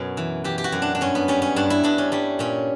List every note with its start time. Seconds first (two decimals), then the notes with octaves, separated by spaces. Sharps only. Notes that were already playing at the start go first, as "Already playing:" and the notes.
Already playing: F#2 B2 B4 C#5
0.17 E3
0.44 E3 G4
0.58 G4
0.64 F#4
0.72 F#2
0.82 D4
0.95 D4
1.01 G2 C#4
1.15 B3
1.28 G3 C#4
1.42 C#4
1.56 G2 D4
1.70 E4
1.83 G2 D4
1.98 C#4
2.12 G3 C#4
2.39 A#2 C#4